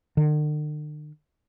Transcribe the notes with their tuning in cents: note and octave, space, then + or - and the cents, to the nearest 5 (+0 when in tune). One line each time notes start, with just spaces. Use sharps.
D3 +45